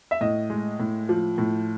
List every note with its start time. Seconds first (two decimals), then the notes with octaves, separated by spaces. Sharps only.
0.11 E5
0.21 A2 D#5
0.50 G#3
0.80 A2
1.09 F3
1.38 A2